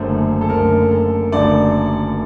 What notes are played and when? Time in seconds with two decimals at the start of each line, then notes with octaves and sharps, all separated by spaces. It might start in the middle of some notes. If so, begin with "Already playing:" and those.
Already playing: F#1 F#2 D3 A3 C5
0.41 A4
0.49 F#1 F#2 D3 A3 A#4
0.91 A4
1.32 F#1 F#2 D3 A3 D5